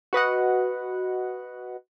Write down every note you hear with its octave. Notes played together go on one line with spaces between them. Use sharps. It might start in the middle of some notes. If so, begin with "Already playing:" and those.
F#4 B4 D#5 F#5